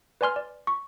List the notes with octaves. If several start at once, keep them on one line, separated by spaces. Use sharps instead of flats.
B4 D5 G#5 C6 F6
D5
C#6